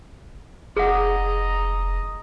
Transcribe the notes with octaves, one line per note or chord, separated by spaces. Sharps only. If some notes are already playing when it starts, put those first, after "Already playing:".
F1 G#4 D#5 F#5 A#5